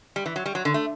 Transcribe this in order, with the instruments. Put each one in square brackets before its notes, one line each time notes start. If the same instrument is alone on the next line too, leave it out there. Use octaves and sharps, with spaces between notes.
[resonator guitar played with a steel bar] G3
E3
F#3
G3
F#3
D3
A3